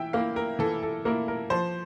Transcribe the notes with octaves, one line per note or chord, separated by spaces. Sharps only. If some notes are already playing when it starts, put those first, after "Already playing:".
Already playing: E3 E5 G5
A#3 E4 F5
A#4
E3 A4
A4
A#3 E4 A#4
A#4
F3 C5